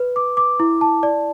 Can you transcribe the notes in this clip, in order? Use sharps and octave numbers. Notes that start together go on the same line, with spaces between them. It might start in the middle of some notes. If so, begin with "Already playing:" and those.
Already playing: B4
D6
D6
E4
A5
D5